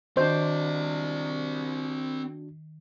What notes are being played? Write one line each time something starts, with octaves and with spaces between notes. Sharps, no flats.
D#3 C4 D4 F#4 C5 D5